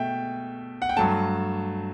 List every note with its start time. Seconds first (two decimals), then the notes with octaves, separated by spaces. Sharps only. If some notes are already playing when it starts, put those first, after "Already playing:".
Already playing: B2 A3 E5 G5
0.82 F#5
0.89 G5
0.97 G2 F#3 A3 A5